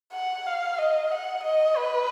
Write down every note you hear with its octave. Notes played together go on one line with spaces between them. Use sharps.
F#5
F5
D#5
F#5
D#5
B4